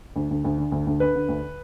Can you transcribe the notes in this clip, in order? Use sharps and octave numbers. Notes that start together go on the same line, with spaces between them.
D2
D2
D2
D3
D2
D2
D3 B4
D3
D2